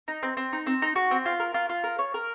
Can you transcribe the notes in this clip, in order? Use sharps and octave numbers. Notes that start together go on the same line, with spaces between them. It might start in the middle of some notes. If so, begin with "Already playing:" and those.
D#4
C4
C4
D#4
C4
D#4
F#4
C4
F4
A#4
F4
F4
A#4
C#5
A#4